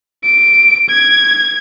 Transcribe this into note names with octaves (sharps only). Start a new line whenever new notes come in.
D7
G#6